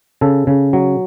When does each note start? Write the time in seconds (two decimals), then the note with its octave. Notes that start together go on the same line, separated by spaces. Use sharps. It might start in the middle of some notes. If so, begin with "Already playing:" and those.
0.21 C#3 A4
0.47 C#3
0.73 F#3